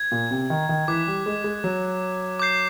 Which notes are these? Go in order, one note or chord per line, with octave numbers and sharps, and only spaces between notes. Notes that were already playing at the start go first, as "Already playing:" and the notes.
Already playing: G#6
A#2
C3
D#3
D#3
E3 D6 F#6 B6
G3
G#3
G#3
F#3
D6 G6 C7